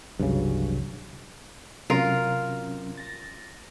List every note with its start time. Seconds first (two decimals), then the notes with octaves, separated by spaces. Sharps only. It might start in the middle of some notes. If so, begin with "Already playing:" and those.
0.19 F1 C2 G2 C#3 E3 F#3
1.90 C3 F#3 C#4 F4 A#4
2.97 A6 A#6